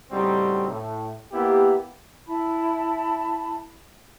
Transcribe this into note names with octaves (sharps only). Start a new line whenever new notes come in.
A2 C#3 G3 C4 D#4 F#4
A2
A#3 B3 E4 G4
E4 A5 B5